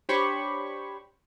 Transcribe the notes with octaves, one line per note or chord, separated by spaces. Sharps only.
D4 G4 C5 C#5 B5 C#6